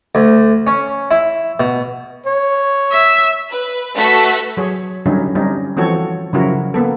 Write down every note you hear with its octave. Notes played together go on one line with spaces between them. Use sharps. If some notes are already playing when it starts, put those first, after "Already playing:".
D2
C#4
E4
B2
C#5
E5
B4
A3 F#4 A4 B4 B6
F#3 G#4 C#5
D3 F#3 G3 C#4 D#4 E4
G3 C4 C#4 D#4
E3 F3 C4 F#4 A4 C#5
C#3 F3 F#3 E4 F#4 A#4
A#3 B3 A4